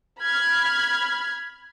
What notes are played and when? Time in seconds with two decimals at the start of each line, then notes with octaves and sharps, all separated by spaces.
0.21 B5 F6 G#6